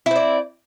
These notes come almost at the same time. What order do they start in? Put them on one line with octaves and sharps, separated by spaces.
E4 C4 D5